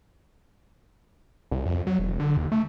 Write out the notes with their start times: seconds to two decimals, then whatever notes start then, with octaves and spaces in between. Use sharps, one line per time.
1.51 C2
1.66 F2
1.87 F#3
1.99 E1
2.20 D3
2.37 D#2
2.52 A3